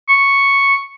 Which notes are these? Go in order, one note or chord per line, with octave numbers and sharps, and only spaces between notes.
C#6